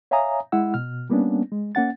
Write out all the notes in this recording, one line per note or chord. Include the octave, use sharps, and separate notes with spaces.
C#5 E5 F5 G#5 A#5 D#6
G#3 E4 F#5 E6
B2 F6
G3 A#3 B3 C#4 D4
G#3
A#3 C#4 F#5 A6